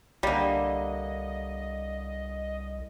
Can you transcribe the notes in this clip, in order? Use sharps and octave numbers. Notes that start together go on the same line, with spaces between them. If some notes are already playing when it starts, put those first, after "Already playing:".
C2 D3 G3 A#3 D#5